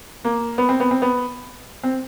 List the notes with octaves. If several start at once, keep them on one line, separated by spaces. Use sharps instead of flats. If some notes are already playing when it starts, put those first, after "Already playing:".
A#3
B3
C4
B3
C4
B3
C4